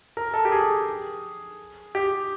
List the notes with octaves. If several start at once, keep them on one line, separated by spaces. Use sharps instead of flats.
A#4
A4
G4
G#4
G4